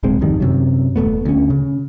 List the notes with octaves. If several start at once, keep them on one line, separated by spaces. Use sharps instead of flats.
D1 B1 G#3 C4
G#1 F2 D#3 G3
F#2 C3 F#3
D#1 C#2 A3 B3
D2 C#4
C#3